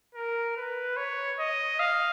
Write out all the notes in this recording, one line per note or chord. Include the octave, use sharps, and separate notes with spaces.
A#4
B4
C#5
D#5
F5